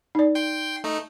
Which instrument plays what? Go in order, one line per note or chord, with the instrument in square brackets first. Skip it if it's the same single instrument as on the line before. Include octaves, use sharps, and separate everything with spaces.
[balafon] D#4 D5
[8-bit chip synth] G5 C6
A3 D#4